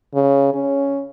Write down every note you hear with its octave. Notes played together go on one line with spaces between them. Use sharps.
C#3
C#4